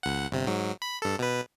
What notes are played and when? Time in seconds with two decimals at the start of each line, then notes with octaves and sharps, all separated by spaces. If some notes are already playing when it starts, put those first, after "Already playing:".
0.03 C#2 F#5
0.31 G1 C3
0.47 G#2 F#3
0.82 B5
1.02 G2 A4
1.19 B2 B4